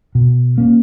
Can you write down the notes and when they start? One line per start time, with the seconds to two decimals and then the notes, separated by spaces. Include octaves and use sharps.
0.15 B2
0.58 A#3 C#4